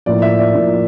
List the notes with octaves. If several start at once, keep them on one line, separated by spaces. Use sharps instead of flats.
A2 F3 A#3 D5
E5
D5
A2 F3 A#3